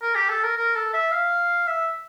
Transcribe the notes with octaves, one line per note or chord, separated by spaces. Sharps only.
A#4
G4
A4
A#4
A#4
A4
E5
F5
E5